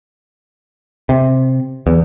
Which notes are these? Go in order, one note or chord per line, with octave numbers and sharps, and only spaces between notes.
C3
E2